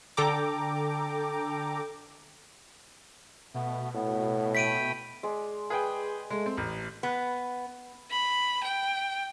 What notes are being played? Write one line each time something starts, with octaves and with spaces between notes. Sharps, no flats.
D3 A4 G5 A#5 D6
B2 A3 B3
A2 B3
A3 G5 B5 B6 D7 D#7
G#3 D5
G#4 B4 G5
G#3 A3
C4
A1
B3
B5
G5